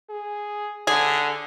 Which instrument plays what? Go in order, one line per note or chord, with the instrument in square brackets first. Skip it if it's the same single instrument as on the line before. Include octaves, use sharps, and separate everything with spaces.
[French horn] G#4
[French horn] D3 [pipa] G#4